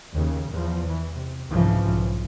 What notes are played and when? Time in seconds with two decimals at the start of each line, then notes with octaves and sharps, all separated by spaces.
0.14 D#2 C#3
0.48 E2 F3
0.86 E3
1.15 C3
1.48 C2 F2 G#2 C#3 E3 F3
1.86 B1